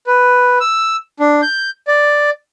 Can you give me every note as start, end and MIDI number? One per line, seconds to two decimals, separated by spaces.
0.07 0.59 71
0.61 0.96 88
1.20 1.41 62
1.42 1.70 91
1.87 2.30 74